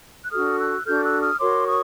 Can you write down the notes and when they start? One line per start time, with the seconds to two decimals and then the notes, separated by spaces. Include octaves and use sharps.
0.23 F#6
0.31 D4 F#4 A4 D#6 F6
0.59 E6 F#6
0.86 D4 F#4 A4 F6 G6
1.04 E6 F#6
1.22 D#6 F6
1.40 F#4 A#4 C#5 C6 D6
1.68 C#6 D#6